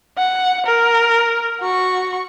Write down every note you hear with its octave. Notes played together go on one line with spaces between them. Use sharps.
F#5
A#4
F#4 C#6